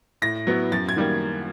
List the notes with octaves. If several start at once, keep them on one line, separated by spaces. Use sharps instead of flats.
A2 A#6
F#3 B3 E4
F#2 A6
G#6
D#3 G3 A#3